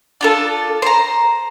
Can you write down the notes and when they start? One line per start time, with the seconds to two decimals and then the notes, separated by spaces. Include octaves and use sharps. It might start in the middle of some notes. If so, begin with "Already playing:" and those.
0.21 D4 F4 A4
0.82 C5 A#5